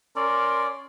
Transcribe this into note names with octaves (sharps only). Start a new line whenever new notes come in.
C#4 A#4 D5 C6